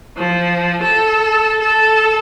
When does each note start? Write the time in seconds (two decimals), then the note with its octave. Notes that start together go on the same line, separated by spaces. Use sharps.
0.17 F3
0.83 A4
1.61 A4